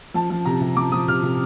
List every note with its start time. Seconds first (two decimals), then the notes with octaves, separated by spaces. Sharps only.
0.14 F3 A5
0.30 F3
0.45 C3 A#5
0.61 C3
0.76 F3 D6
0.92 F3 D#6
1.08 C3 F6
1.23 C3